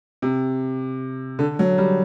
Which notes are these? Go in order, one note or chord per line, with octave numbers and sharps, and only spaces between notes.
C3
D3
F#3
G3